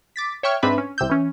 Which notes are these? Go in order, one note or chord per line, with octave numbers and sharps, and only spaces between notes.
D6 A6 B6
C#5 E5 G5 C#6 F6 G#6
G#2 C4 D4 B4 E5 B5
C#4
C2 C3 E6 G6
E3 C#4